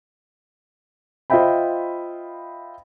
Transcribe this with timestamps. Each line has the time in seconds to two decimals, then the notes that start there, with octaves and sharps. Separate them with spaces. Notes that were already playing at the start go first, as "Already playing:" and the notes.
1.30 F4 C5 D#5 E5 G5 B5